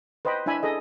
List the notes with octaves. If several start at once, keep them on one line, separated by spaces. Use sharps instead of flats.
B4 C5 D#5 G5 B5
D4 E4 E5 G#5 B5
G#4 A4 D#5